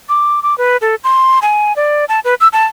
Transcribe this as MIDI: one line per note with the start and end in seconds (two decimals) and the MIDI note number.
0.09 0.42 86
0.43 0.57 86
0.58 0.77 71
0.82 0.95 69
1.04 1.39 84
1.42 1.75 80
1.76 2.05 74
2.09 2.20 81
2.25 2.35 71
2.41 2.48 88
2.53 2.65 81